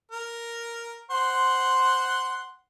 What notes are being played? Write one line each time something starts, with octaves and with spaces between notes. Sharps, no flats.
A#4
C5 F#5 C6